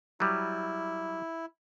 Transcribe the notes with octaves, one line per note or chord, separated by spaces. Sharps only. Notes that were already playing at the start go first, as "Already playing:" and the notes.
F#3 G3 E4